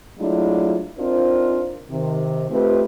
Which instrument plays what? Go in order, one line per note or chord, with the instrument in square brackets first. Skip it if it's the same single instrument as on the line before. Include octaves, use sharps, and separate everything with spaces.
[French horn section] F#3 G#3 A3 D4 E4 F4
C4 D4 D#4 F4 A#4 C5
C3 D#3
A3 C4 D#4 F4 G4 B4